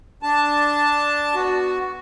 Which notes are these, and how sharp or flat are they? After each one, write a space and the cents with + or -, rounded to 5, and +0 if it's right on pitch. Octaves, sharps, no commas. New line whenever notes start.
D4 +0 A5 +0
B3 +0 F#4 +0